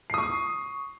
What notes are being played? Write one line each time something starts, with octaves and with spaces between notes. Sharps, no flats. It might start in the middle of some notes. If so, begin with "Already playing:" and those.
C#6 D#6 C7